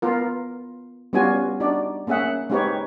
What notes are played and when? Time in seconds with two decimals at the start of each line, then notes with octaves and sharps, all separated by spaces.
0.02 B3 F4 A#4
1.13 G3 B3 C#4 F4 F#4 G#5
1.60 D4 D#4 F#4 D5
2.07 A#3 C#4 G#4 E5 F#5
2.50 G#3 C4 D#4 G4 B4 C#5